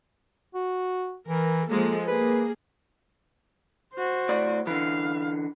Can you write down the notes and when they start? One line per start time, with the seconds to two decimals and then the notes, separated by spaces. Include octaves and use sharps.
0.54 F#4
1.29 E3 A#4
1.69 F3 G#3 A#3 A4
2.07 A#3 G#4 B4
3.94 F#4 C5
4.29 A2 D5
4.67 D3 E3 F5